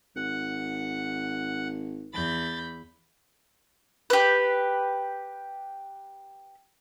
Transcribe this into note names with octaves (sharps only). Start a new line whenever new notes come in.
G#1 F#5
E2 B5 G6 A6
G4 B4